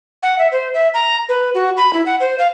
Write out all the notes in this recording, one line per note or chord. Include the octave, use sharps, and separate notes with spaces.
F#5
E5
C5
E5
A#5
B4
F#4
B5
E4
F#5
C5
F5